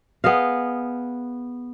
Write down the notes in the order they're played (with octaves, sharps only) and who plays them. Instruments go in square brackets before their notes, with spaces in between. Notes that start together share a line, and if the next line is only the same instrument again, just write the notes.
[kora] B3 G#4 D#5 F5